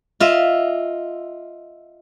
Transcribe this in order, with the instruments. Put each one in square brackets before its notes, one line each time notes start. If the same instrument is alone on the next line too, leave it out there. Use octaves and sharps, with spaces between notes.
[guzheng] F4 D#5 E5